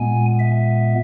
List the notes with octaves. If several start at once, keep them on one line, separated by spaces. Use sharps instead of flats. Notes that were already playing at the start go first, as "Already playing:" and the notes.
Already playing: A#2 G#3 B3 G#5
E5